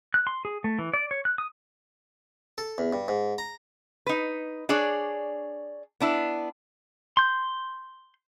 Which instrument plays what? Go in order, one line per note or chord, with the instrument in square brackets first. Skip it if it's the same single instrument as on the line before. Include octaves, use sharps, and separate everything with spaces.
[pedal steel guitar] F#6
C6
G#4
A3
E3
D5
C#5
F#6
D#6
[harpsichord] A4
E2
G2
G#2
A#5
[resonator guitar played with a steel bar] D#4 B4
D4 G#4 C#5 D5
B3 D4 E4
[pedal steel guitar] C6 G6